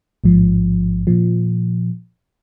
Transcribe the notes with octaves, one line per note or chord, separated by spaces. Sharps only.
A1 G#2 F3
A#2 F3